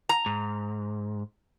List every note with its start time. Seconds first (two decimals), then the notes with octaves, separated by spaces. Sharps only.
0.09 A#5
0.26 G#2